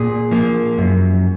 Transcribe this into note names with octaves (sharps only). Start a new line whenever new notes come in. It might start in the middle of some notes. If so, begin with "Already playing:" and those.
Already playing: A#2 G#4
F3 A#3
F#2